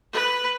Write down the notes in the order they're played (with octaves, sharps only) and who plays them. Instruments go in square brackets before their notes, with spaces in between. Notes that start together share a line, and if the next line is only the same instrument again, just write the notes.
[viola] B4